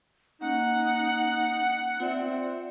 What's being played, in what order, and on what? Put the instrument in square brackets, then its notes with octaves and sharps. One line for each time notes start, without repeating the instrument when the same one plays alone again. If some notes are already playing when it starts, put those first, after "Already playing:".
[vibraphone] A#3 C#4 [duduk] D#4 [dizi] F#5
[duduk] C4 [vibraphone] F4 D5 E5